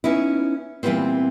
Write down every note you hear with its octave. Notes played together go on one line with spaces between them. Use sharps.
B3 C#4 D#4 E4
A#2 E3 F#3 G3 B3 C4